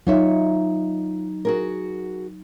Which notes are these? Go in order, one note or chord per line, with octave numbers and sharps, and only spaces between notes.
F#3 D#4 F4 C#5 E5
F#4 G#4 A#4